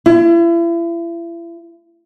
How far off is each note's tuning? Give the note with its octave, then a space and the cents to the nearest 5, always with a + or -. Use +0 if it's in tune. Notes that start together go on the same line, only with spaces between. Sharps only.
E4 +40